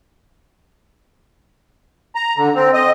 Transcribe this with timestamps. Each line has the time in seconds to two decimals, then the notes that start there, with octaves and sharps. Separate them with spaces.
2.15 A#5
2.38 D3
2.55 C4
2.74 D#5